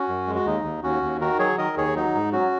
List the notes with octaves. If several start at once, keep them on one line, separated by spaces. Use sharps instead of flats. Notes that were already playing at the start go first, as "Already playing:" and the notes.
Already playing: C#4 F#4
F#2
G#3
F#4
D#2 D#4
D#2
D#2 C#4 F#4
D#2
D#3 F#4 A#4
F#3 G#4 C#5
D#3 A#4 D#5
D#2 G#4 C#5
F#3 D#4
G#2
F#3 C#4 F#4